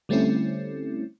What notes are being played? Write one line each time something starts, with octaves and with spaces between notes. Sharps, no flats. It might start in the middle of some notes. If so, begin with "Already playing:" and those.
D3 G3 A3 C4 C#4 E4